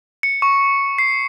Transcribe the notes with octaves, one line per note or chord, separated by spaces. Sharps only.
C#7
C#6
C7